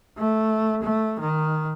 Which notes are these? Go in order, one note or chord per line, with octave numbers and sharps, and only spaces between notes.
A3
A3
D#3